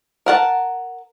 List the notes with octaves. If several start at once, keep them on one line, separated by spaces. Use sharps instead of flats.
A#4 F#5 A5